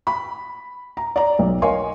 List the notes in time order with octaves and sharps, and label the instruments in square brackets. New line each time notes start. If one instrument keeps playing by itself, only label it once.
[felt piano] B5
A#5
D5 A#5
B1
A#4 C#5 D#5 F5 G#5 C6